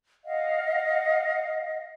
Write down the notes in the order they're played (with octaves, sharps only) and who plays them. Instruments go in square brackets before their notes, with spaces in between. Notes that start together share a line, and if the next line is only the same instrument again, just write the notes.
[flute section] D#5 F5 F#5